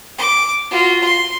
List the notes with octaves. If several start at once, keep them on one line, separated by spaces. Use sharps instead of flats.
D6
F4 F#4
C6